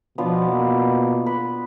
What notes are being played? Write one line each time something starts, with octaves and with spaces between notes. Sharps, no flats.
B2 F3 B3 D4 F4
A#3
B4